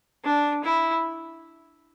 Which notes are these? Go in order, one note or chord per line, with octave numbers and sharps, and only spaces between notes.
D4
E4